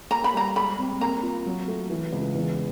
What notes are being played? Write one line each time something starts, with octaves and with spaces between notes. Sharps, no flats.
A#3 A#5
B5
G3 A#5
G#3 B5
C4
A#3 A#5
F4
F#3
A3
E3
C#2
E2